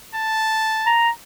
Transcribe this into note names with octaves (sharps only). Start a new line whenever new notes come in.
A5
A#5